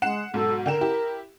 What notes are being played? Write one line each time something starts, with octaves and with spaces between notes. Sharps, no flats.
G#3 F#5 C7 E7
G#2 B2 F#3 A4
D3 A#4 G5 E7
E4 G4